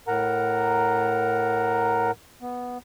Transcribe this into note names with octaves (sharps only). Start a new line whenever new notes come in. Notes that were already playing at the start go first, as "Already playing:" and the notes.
A2 A#4 F#5 A#5
B3